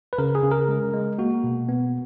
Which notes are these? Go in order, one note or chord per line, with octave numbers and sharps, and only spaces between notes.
B4
C#3 A#4
G#4
C#3
A#4
G#3
G#3
A#3 F#4
B2
B3